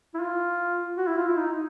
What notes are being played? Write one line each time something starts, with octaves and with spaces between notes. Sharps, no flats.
E4
F4
F#4
E4
F4
E4
D#4